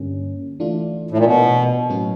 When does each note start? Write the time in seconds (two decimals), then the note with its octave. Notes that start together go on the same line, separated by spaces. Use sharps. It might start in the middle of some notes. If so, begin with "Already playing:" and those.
Already playing: G2 D3 G3 A#3 C#4
0.60 E3 A3 D4 F4
1.11 A2
1.18 A#2
1.25 B2
1.89 A2 F#3 A#3 C#4 F#4